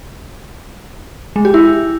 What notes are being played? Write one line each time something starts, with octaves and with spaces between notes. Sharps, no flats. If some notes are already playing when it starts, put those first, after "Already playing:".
G#3
G4
E4